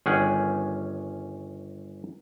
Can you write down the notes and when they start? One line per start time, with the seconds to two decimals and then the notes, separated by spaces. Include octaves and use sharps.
0.06 G1 D#3 C#4 G#4 F#5 G5